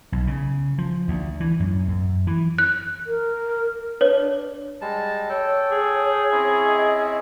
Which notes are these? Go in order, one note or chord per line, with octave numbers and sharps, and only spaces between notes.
B1
C#3
F3
D2
E3
F#2
F#2
E3
F#6
A#4
D4 B4 C#5
G3 G#3 A5
A4 C#5 G5
G#4
C4 C#4 E4
D#5